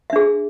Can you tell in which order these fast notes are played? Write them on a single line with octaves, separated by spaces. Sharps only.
E5 D4 G#4